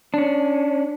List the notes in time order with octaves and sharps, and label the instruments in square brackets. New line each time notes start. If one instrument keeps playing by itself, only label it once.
[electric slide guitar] C#4 D4